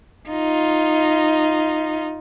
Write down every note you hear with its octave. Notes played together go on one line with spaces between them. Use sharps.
D#4 F4